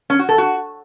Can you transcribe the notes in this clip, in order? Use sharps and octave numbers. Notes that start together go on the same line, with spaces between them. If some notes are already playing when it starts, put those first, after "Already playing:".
C#4
F#4
A4
F#4